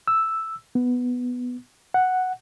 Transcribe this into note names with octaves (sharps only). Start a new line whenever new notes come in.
E6
B3
F#5